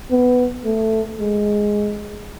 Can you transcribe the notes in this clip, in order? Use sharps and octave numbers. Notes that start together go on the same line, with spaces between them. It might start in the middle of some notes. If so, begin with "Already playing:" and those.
B3
A3
G#3